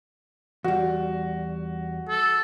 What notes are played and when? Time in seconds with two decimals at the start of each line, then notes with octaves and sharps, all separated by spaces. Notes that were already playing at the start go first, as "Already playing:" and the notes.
0.64 E2 G3 F#4
2.09 A4